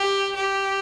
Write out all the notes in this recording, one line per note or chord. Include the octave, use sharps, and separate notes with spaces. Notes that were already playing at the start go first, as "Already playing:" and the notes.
Already playing: G4
G4